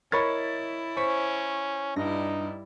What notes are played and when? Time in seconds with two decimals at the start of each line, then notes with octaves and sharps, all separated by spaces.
0.12 E4 A#4 C#5 D#5 B5 C#6 A6
0.97 C#4 C5 C#6 B6 D#7
1.96 G2 G3 D#4 E4 A#6